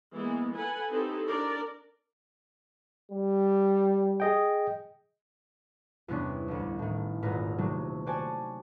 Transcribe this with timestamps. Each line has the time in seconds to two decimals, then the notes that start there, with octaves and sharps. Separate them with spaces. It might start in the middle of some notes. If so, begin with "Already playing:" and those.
0.13 E3 G#3 A#3 B3
0.54 A4 B4 F#5 G#5
0.90 C4 D#4 E4 G4 A4 B4
1.28 D4 A#4 D5
3.12 G3
4.20 G#4 D#5 G5
6.08 E2 G2 C3 B3 C#4 D4
6.48 A1 D2
6.79 A2 D#3
7.22 D#1 G#1 G#2 D#4 A#4 B4
7.58 C3 D#3 F#3 A3
8.06 F#4 C5 D5 F#5 G#5 A5